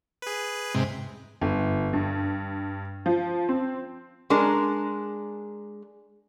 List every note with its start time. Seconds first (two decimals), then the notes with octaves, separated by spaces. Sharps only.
0.22 G#4 B4
0.75 G#2 C3
1.42 G1
1.93 G2
3.06 F3
3.49 C4
4.30 G#3 D4 A#4